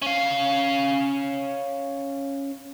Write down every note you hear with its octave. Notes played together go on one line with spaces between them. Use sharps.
C#4 F5